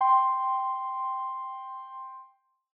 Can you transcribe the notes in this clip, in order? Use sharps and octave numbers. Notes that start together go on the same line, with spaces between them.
G5 C6